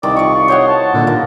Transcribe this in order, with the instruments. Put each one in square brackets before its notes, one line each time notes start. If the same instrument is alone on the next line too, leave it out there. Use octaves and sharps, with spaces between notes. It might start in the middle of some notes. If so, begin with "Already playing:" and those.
[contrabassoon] C2 [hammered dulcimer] D#3 [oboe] D5
[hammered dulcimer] F4 D5 [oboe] C#6
[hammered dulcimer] C5 D#5 F#5 [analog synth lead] C#5
[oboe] A5
[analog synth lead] A#2 [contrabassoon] D3
[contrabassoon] D#2 [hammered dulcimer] A#3